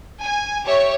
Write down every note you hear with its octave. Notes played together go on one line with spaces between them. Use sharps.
G#5
G4 C#5 E5